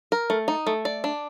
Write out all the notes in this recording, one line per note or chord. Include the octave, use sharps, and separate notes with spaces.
A#4
A3
D#4
A3
D5
D4